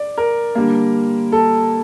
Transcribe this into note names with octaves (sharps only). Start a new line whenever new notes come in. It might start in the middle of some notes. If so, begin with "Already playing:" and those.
Already playing: D5
A#4
D3 G3 A#3
A4